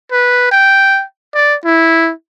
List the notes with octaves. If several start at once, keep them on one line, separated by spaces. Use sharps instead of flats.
B4
G5
D5
E4